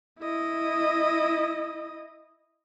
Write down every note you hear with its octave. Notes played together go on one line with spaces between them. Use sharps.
E4 D#5